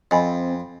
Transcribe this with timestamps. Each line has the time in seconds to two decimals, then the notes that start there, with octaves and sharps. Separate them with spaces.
0.11 F2 C4 D#5 G#5 B5